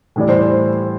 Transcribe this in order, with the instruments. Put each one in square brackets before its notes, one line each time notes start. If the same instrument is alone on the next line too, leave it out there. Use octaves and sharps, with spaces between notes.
[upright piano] A2 E3 G3 [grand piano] D5
[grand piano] C5
C5